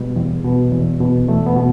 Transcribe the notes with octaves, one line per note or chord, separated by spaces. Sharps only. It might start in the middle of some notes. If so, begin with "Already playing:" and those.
Already playing: B2 G3
E2
B2
E2
B2
E2 A3
B3
B2